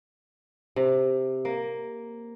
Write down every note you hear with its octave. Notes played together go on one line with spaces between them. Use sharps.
C3
A#3